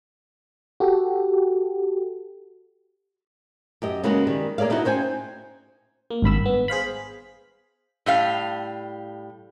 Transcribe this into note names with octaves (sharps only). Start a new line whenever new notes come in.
F#4 G4 A4
F#2 G4 D#5
C#3 G#3 A#3 B3 C#4 F#4
D#3 G3
A#3 G#4 C#5 D5 F5
B3 D#4 E4 F#4
C#4 C5 G5 G#5
A#3
G#1 G2 B5 E6
B3
G#4 C5 F5 B5
A2 G3 F5